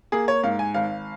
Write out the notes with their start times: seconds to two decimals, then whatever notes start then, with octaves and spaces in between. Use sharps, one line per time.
0.12 A#3 G#4
0.28 C#5
0.43 G#2 F5
0.59 G#5
0.74 G#1 F5